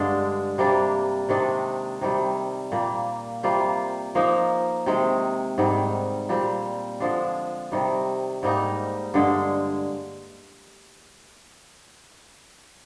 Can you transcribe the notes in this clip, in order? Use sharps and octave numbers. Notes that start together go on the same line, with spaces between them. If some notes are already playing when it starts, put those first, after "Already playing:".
Already playing: G2 D3 G#3 D4
C3 G3 A#3 D4
C3 D#3 G#3 D4
C3 D#3 G3
A#2 G3 A#3
C3 G3 A#3 F4
F3 A#3 D#4
C3 D#3 G#3
G#2 D#3 G3
A#2 G3 C4
D3 F3 G#3 D4
C3 D#3 G3
G#2 G3 A#3 D#4
G2 D3 G#3